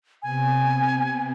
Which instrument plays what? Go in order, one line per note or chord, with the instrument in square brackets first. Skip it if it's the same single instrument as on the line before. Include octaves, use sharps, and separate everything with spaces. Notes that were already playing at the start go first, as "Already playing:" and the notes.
[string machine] C3 B3 C4 [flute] G#5